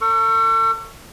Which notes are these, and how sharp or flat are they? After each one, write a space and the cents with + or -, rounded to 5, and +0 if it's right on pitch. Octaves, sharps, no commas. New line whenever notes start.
A4 +40 C#6 +0